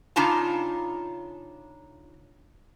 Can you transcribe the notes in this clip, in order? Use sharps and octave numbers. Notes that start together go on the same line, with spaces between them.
C#3 D4 D#4 F4 A5 A#5